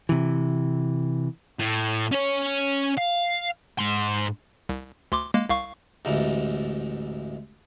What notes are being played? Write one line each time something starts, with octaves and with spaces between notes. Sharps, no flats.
C3 E3
A2
C#4 C#5
F5
G#2 C6
C2
D2 C6 D6
G#3 A#3
C2 F5 C#6
A1 D2 G#2